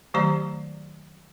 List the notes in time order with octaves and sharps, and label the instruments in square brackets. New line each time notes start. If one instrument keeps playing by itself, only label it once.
[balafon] D#3 F#3 A3 G4 D5 A#5